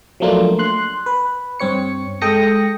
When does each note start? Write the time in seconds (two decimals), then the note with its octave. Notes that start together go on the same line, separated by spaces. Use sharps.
0.20 F3 F#3 A3 A#3 D4 F4
0.59 C6 F#6
1.06 B4
1.60 G2 C4 C#5 C#7
2.21 G#3 A4 G5 D#6 A#6 C#7